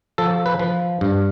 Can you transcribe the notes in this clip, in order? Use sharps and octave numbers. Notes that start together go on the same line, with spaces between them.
F3 A4
B4
F3
G2